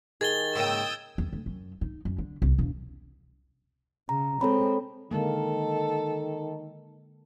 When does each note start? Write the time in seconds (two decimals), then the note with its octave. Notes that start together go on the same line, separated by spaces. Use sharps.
0.21 D#3 G#4 G#6 A6 G7
0.55 G#2 C#3 A#3 G5 D#6 E6
1.18 E2
1.33 D2
1.46 F#2
1.81 D#4
2.05 F#2
2.18 D3
2.42 C2
2.59 E1
4.09 C#3 A#5
4.41 G#3 C4 A4 C#5 B5
5.11 D3 D#3 G#3 A#3 A4